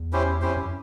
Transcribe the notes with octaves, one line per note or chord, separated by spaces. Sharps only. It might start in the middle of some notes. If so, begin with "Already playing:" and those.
Already playing: E2
C#4 E4 G4 C5
F2 C#4 E4 G4 C5
F#2